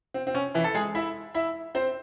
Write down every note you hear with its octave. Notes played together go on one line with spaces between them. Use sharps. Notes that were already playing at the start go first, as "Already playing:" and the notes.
C4
C4
C#4
E3 E4
A4
G#3 G#4
E4 E5
E4 E5
C4 C5